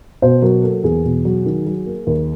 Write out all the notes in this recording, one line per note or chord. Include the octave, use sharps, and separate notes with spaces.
B2 C5
F#3 A#4
A#3 A4
E2 G#4
B2
F#3
D#3
F#3
A#3
D#2